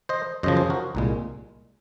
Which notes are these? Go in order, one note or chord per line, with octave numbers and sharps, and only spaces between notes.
C5 D#5
F#2 C#3 F3 C5 D#5
G#4 C5
F#4 A#4
C2 A#2 G#3